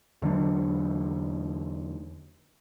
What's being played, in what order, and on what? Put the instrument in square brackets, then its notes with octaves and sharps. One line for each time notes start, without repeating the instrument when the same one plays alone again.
[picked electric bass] E2 D3 F#3 D4